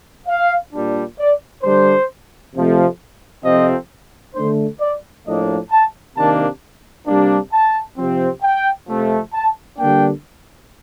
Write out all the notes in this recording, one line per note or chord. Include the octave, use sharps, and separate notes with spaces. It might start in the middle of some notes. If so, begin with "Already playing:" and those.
F5
A#2 G3 D4
D5
D3 G3 D4 C5
F2 C3 F3 A3
F2 C3 F3 C4 D#5
D3 A3 D4 C5
D5
A2 F3 A#3 D4 D#5
A5
C3 D#3 A#3 D4 A5
C3 G3 A#3 D4
A5
C3 F3 C4
G5
F2 C3 F3 A3
A5
D3 G3 A#3 D4 G5